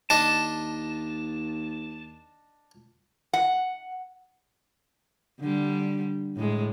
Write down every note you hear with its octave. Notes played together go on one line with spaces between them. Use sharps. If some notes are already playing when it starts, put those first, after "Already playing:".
D#2 D4 D#5 A5
F#5
D3 G3
A2 G#3